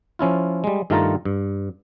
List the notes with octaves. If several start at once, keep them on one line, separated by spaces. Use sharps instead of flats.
F3 C#4 E4 F4
G3 G#3
G2 D#3 A3 F4 A5 A#5
G2